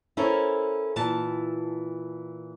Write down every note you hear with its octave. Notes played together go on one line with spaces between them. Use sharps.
C#4 E4 A4 A#4 C5 C#5
A#2 E3 A5